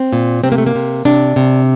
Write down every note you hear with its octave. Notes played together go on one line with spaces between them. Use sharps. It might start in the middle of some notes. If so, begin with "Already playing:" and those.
Already playing: C4
A#2
C3 C4
A#3
A3
A#3
C3
C3 D4
C3